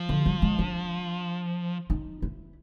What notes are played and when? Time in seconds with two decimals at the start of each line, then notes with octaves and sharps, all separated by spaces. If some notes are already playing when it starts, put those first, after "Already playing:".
Already playing: F3
0.09 D3
0.26 G3
0.42 G#3
0.59 D4
1.90 D#4
2.22 E4